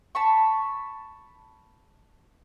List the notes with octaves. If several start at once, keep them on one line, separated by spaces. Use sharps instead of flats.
A5 B5 C#6